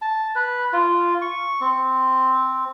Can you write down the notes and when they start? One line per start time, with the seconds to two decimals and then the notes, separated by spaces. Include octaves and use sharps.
0.02 A5
0.36 B4
0.73 F4
1.22 C#6
1.61 C4